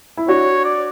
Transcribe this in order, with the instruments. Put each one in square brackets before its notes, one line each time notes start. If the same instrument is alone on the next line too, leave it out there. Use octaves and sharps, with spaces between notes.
[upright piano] E4
[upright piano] D4 F#4 [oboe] C#5
[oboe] D5